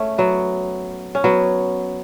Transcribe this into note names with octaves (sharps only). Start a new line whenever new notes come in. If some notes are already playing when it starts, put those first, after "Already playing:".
Already playing: A3 C#4
F#3 B3
C#4
F#3 B3